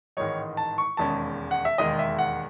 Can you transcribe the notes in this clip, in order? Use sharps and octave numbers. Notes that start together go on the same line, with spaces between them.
A1 G#2 D#3 G#3 D#4 C#5
A5
C#6
E1 D#2 D#3 G#3 C#4 A5
F#5
E5
E1 D#2 D#3 G#3 D#5
E5
F#5